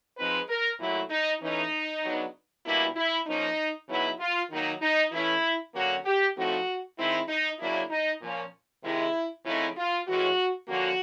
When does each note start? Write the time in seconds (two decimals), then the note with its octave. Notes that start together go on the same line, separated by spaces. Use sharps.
0.18 F3 G#3 C4 D#4 B4
0.49 A#4
0.79 A#2 F#3 A3 E4
1.10 D#4
1.41 E3 A3 C#4 D#4
2.03 C#3 F#3 B3 D4
2.64 B2 G3 A#3 D4 E4
2.96 E4
3.26 F3 A#3 C#4 D#4
3.88 C#3 F#3 B3 D#4 E4
4.19 F4
4.50 D#3 F#3 A#3 D#4
4.81 D#4
5.12 E3 A3 C#4 E4
5.74 D3 F#3 A#3 C#4 F#4
6.05 G4
6.36 A2 F3 A3 C4 D#4 F#4
6.98 D#3 G#3 C4 D#4 E4
7.28 D#4
7.59 C#3 F#3 A#3 D4 E4
7.90 D#4
8.21 A#2 F3 A#3 C#4
8.83 C3 D#3 G#3 E4
9.45 C#3 F3 A3 C4 D#4 E4
9.76 F4
10.07 A2 E3 G#3 C#4 F#4
10.68 D3 F3 A#3 C#4 F#4